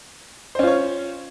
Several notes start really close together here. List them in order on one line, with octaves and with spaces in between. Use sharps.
C5 C#4 F4 C#5